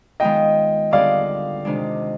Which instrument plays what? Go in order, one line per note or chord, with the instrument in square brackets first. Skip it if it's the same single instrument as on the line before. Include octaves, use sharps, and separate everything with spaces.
[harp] D#3 G#3 B3 F4 [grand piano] D#5 G5
[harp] D3 G3 B3 F4 G#4 [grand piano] D5 F5
[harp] C3 D#3 G#3 D4